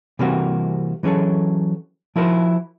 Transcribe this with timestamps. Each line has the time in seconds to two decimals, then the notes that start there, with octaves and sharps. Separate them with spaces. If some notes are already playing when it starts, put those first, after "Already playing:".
0.19 C3 E3 G3 A#3 C4 F#4
1.03 E3 F#3 C#4 G#4 A4
2.16 F3 E4 F#4 A#4 C5